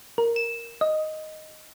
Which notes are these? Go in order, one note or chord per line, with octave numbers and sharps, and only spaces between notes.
A#4
E7
D#5